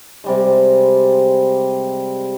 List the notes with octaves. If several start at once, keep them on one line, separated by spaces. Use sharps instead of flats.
C3 G3 G#3